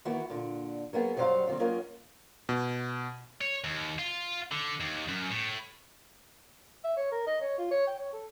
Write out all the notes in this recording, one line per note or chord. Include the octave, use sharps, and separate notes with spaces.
D#3 E3 A#3 B3 E4 F#4
A#2 D3
F#3 A#3 B3 G#4
F#2 F#3 G3 C5 F5 A#5
C3 D#3 F#3 G3 C4
F#3 A#3 C#4 F4 A#4 D#5
B2
C#5
D#2
F4
D3
D#2
F#2
A2
E5
C#5
A#4
D#5
C#5
F4
C#5
G5
C#5
A4